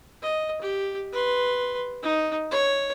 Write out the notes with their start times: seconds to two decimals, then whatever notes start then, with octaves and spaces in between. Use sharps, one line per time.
0.22 D#5
0.62 G4
1.13 B4 C6
2.03 D#4
2.51 C#5